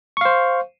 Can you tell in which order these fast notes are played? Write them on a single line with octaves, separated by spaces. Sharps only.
C#6 F5 C5